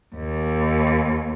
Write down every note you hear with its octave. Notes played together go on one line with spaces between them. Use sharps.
D#2